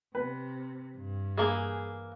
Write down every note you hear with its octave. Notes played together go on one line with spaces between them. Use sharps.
C3 B4
G2
E3 A#3 G#4